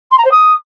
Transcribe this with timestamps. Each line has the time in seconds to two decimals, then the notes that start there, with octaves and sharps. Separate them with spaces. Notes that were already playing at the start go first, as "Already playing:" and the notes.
0.11 C6
0.18 A#5
0.24 C5
0.31 D#6